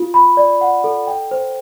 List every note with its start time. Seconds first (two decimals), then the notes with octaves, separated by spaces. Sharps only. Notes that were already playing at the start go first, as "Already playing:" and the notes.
Already playing: F4
0.14 B5
0.37 D5
0.61 F#5
0.84 A4
1.07 G5
1.31 C5